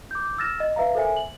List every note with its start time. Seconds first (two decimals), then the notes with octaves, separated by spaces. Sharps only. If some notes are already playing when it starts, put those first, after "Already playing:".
0.11 D6 G6
0.38 E6 F6 A6 A#6 E7
0.60 D#5
0.76 B4 E5 F5 A#5
0.95 A4 A#4 C5 E5 G#5
1.17 F#7